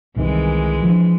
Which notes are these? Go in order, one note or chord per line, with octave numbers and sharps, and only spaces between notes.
C2 C3 D#3 E3 G#3
F3 D4